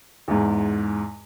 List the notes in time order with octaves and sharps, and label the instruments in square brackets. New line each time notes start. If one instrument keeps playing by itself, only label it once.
[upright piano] E2 G#2